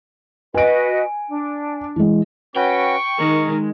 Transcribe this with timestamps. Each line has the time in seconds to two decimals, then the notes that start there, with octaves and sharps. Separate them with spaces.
0.54 F#4 B4 D#5 G#5 D7
1.29 D4
1.96 E3 G#3
2.56 C#4 F#4 B4 G5 C#6
3.19 D#3 G#3 A#4